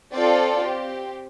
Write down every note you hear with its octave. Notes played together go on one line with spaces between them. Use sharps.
C4 F4 A4 D5
C4 G4